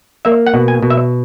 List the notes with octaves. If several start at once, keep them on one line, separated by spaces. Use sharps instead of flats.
A#3 E5
F#5
B2
G#5
B2
E5